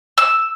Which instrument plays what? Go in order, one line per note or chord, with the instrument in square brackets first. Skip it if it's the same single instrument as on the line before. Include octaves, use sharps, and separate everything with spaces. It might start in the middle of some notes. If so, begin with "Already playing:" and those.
[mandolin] E6